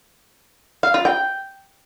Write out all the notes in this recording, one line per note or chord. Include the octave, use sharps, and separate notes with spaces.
F5
F4
G5